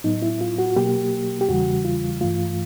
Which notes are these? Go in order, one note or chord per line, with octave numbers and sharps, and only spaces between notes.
A2 F#3 B3 D#4
E4
F4
F#4
B2 F#3 A#3 G4
G4
E2 C#3 E3 G3 F#4
F4
G2 E3 A3 F4